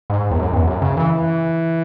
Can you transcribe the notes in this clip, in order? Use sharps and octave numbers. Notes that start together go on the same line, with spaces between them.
G#2
E2
F#2
E2
F#2
C#3
E3